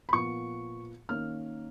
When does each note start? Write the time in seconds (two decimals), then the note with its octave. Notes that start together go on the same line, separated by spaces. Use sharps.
0.09 B5
0.13 A#2 F3 B3 C#6
1.09 D#3 A#3 C#4 F6